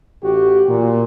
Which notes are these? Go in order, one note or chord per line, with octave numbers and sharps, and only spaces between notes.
A1 F#4 G4
A#2